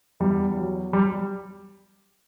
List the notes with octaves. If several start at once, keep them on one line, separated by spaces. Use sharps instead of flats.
E2 G3
F#3
G3